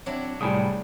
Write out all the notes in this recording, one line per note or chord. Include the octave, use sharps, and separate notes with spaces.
F#3 C4 D4 E4
C2 A2 G3 G#4 G#5 D#6